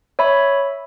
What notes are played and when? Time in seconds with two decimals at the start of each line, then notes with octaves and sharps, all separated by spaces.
0.19 C#5 E5 B5